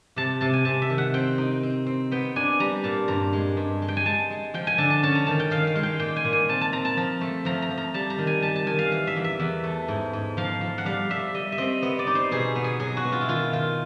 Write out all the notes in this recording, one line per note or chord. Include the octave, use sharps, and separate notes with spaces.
C3 A5
C3 A5
G#5
C3 A5
E5
D#3
F#5
C4 G5
D#4
C4
C4
B3 G5
D4 G#5
G3 A#5
A#2 A5
G2 A#5
G#3
G2
G#3
G5
G#5
G#3 A5
G#3
F3 G5
G#5
D3 A5
A5
C#4 A5
A#5
D#3 A5
G5
D#3 F5
F5
G#3
G5
A#2 G5
G#5
A#2
G#5
C4 A5
A5
C4 A#5
A5
F3 A#5
A3
F3 A#5
A#5
F3
A#5
G3 A5
A#5
D#3
G#5
G3 A5
A5
D#3 G#5
F5
E3 F5
E5
E2
E5
E2
A3
G#2
G#2
F3 F5
F3
F#5
G3 F5
G3 E5
G3 D#5
E5
C4 D#5
B3 D#5
D5
D#4
C5
B2 G#4
B3
G#4
F#3 G#4
F#4
B3
F4
E4
D#3 F4
D#3 F4